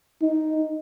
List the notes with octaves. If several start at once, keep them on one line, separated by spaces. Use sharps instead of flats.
D#4